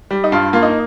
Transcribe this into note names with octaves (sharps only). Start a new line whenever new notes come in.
G3
D#4
G2 F4
A#3 F4
D#4